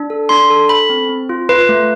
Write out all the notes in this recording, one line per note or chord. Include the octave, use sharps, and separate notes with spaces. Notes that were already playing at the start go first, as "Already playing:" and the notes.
Already playing: D4
A4
D4 C6
A4
A4 B5
C4
C4
F4
F4 B4
A3